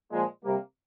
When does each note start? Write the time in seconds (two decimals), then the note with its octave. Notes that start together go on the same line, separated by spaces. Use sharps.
0.11 A#2 F3 G#3
0.44 C3 G3 A#3